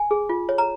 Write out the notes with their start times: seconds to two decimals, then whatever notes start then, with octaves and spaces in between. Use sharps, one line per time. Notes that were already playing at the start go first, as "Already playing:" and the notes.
Already playing: G#5
0.11 G#4
0.29 F4
0.49 C#5
0.58 A#5